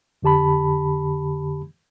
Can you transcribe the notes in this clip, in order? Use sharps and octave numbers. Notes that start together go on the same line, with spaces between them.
F2 D3 G4 A5 B5